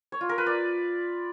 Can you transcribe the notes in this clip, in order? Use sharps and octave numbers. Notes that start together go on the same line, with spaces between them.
C#5
F4
A#4
B4
D5